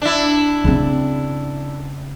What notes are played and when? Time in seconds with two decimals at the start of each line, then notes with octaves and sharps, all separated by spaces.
0.02 D4 E4
0.64 C#3 C4